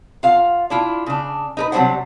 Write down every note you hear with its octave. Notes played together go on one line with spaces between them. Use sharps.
F4 F5
D4 E4 F4
C#3 D4
D#4 A#4 B4
C3 F#3 G3 D4 C5 F#5